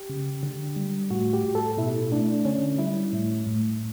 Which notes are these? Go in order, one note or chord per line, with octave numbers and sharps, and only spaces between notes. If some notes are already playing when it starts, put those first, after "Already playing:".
Already playing: G4
C#3
D3
G3
A2 F#4
G4
A2
A4
B2 E4
A3 D4
D3 C#4
G3 E4
A2
A2